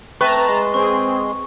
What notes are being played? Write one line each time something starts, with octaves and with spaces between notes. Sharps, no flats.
A3 C4 B4 A5 A#5 C#6
G#3 C6
C4 G#4 C#6